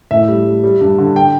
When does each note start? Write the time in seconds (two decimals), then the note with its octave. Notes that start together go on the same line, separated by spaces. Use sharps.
0.11 A2 E5
0.28 G3
0.45 G3
0.64 G3
0.81 G2
0.98 D3
1.16 G5